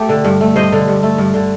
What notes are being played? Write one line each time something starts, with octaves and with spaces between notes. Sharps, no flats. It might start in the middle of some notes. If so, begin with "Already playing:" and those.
Already playing: A3 G4
D3
G2
A3
G2 C5 D#5
D3
G2
A3
G2
D3